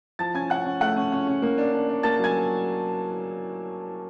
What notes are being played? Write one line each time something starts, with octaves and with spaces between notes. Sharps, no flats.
F3 A5 A6
C#4 G#5 G#6
C#4 F#5 F#6
C#4
A3 F#5 F#6
C#4
C#4
C#4
A#3
D4
D4
D4
A#3 A5 A6
F#3 G#5 G#6